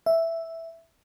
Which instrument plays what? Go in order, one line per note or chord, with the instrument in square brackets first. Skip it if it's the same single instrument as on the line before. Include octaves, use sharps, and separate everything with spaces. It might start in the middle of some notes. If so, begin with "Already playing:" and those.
[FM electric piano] E5